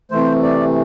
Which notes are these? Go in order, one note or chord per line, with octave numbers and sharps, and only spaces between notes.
C3 E3 A3 C5
D5